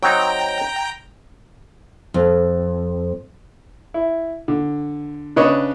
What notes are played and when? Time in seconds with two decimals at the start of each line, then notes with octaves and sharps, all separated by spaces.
0.03 F#3 C4 D#4 G5 A#5
2.14 F2
3.94 E4
4.48 D3
5.36 C#3 D4 B4 C#5 D#5